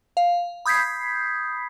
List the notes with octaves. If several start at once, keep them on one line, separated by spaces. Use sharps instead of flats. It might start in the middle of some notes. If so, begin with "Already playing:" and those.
F5
B5 D#6 G6 G#6 B6 C7